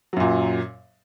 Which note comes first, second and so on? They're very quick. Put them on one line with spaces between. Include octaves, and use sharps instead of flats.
F#3 F#2 A#2